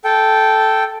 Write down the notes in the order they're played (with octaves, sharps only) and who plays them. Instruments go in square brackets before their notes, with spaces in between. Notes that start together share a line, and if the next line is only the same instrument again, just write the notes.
[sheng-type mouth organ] A4 G5